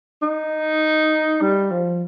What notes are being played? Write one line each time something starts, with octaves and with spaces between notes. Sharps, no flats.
D#4
G3
F3